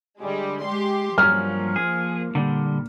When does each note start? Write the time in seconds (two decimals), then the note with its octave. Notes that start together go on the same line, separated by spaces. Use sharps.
0.21 D3 G3 G#3
0.64 G#3 G4 C6
1.18 G2 F3 F#3 A#3 C#4 F6
1.76 G#4
2.35 A#2 D3 G3